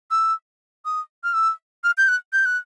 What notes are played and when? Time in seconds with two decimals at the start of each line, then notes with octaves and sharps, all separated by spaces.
0.11 E6
0.85 D#6
1.24 F6
1.34 E6
1.84 F6
1.98 G6
2.08 F#6
2.33 G6
2.45 F#6